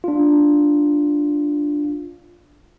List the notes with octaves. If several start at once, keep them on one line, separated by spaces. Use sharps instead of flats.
D4 F4